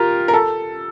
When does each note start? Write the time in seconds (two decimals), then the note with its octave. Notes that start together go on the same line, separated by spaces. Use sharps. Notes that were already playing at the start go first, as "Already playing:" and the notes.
Already playing: F4 G4 A#4
0.28 A#4
0.33 A4